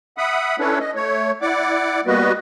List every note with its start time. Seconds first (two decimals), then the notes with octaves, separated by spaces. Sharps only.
0.18 E5 F#5 B5 D#6
0.59 C#4 D4 E4 A4 B4 C#5
0.80 D#5
0.95 A3 C#5
1.42 E4 D5 F#5 D6
2.07 G3 A#3 B3 F#4 B4 D#5